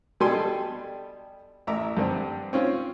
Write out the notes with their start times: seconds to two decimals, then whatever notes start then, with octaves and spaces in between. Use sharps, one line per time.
0.20 B2 G3 D4 A4 G#5 C6
1.67 A1 E5 A#5 D6
1.97 G2 D3 C4
2.53 C4 C#4 F4